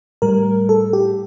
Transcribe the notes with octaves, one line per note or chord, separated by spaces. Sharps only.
A2 G3 A#4
A4
G4